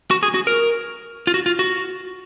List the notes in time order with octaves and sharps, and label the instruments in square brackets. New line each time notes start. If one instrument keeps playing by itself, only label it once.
[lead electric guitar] F#4
G#4
F#4
A#4
F4
F#4
F4
F#4